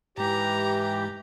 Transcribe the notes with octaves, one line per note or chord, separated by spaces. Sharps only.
G#2 E3 G#3 G4 A#5